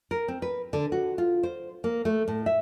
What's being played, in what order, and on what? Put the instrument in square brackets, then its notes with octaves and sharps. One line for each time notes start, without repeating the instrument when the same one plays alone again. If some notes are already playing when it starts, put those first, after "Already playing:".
[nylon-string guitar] A#4
C4
B4
D3
F#4
F4
C5
A#3
A3
A2
E5